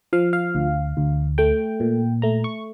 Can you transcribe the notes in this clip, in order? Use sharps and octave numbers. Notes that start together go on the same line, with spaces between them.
F3 F5
F5
D2
D2
A3 G5
A#2
A3 A#5
C#6